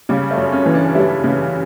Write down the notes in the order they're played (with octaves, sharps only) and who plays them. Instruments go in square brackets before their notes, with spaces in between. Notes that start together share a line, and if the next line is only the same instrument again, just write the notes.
[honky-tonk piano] C#3 [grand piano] G3
[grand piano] A3
[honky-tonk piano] F#2
[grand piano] C#4
[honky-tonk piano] E3
[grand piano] D4
[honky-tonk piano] G3 [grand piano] E4
[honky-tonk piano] C#3